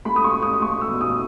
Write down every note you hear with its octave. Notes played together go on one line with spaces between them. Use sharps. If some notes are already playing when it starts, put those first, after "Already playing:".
A3 B5
D#6
C#6
A3
D#6
A3 C#6
E6
B2
D#6